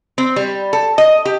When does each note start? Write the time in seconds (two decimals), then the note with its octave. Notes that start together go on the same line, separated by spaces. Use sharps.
0.18 C4
0.36 G3
0.73 A4
0.98 D#5
1.25 G4